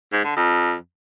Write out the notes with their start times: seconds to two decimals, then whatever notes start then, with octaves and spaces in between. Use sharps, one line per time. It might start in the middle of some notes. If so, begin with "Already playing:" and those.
0.12 G#2
0.24 D3
0.36 F2